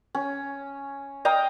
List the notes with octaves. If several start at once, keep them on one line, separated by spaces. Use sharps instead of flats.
C#4
D#5 F5 G5 A#5